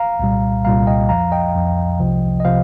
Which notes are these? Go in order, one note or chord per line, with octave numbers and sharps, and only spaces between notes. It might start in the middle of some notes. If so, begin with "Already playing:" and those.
Already playing: F5 A#5
C2 A#2 G3
C2 A#2 G3 F5 A#5
D#5 G5
F2 F3 F5 A#5
D#5 G5
F2 F3
C2 C3 F3
D#5
C3 F3 C5 F5